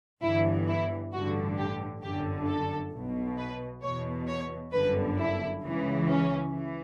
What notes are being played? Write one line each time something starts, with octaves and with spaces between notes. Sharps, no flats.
G1 G2 E3 E4
E4
A1 G2 D3 F#4
G4
G1 F#2 D3 G4
A4
B1 B2
B4
E2 B2 C#5
C#5
G1 F#2 D3 B4
E4
C#2 C#3 E3
C#4
E3